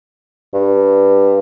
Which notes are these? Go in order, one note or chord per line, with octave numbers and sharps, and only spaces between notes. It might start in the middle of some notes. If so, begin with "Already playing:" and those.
G2